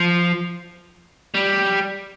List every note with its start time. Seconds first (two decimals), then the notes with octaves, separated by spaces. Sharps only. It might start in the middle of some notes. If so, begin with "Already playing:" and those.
Already playing: F3
1.34 G3